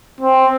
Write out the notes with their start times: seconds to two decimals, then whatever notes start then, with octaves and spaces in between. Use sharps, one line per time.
0.21 C4